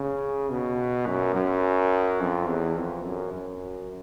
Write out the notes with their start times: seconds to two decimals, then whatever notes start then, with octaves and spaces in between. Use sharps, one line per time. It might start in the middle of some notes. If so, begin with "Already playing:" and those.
Already playing: C#3
0.50 B2
1.07 F#2
1.36 F#2
2.20 F2
2.48 E2
2.76 F2
3.05 F#2
3.33 F#2